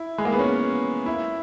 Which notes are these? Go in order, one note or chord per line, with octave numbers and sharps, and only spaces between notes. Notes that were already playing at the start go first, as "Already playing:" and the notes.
Already playing: E4
G#3
A#3
B3
C#4
E4